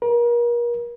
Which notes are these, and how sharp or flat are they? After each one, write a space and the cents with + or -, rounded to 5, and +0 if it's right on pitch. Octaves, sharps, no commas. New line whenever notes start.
A#4 +35